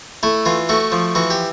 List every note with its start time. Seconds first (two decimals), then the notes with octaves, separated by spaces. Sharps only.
0.23 A3 E4
0.46 E3 F4
0.69 A3 F#4
0.92 F3
1.15 E3 F#4
1.30 G4